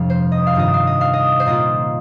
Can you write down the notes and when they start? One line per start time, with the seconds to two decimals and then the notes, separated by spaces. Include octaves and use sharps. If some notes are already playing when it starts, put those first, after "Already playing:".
Already playing: G1 F2 C3 F3 F5
0.10 C5
0.32 D#5
0.47 F5
0.55 G2 D#3 C4 F4 D#5
0.74 F5
0.87 D#5
1.01 F5
1.14 D#5
1.40 C5
1.46 A#2 A#3 F4 D#5